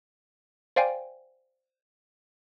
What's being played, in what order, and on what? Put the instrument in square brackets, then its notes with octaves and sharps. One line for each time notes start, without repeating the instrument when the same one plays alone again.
[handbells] C5 D5 F5 G5 G#5